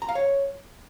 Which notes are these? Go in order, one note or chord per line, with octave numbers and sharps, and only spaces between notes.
A#5
F5
C#5